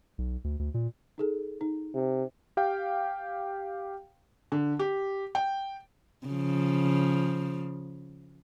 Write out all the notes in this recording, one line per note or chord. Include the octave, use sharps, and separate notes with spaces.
B1
D2
D2
A#2
D#4 G#4 A4
D#4
C3
G4 F5 G5
D3
G4
G5
C#3 F3